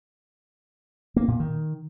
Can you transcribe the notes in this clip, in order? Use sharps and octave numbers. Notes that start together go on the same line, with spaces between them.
A#3
A#2
D#3